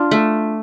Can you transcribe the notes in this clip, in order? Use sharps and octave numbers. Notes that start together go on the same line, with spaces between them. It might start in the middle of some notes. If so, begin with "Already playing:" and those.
Already playing: D4 F4
A3